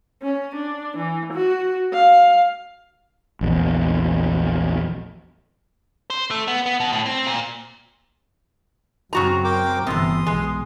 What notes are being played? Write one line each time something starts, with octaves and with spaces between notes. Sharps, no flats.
C#4
D4
E3
F#4
F5
A#1 E2
C5
A3
B3
B3
B2
A2
C4
A#2
F#2 C#3 C4 F#4 A#5
A#4 G5 D6
G1 A2 C3 E3 C6 D#6
B1 G#3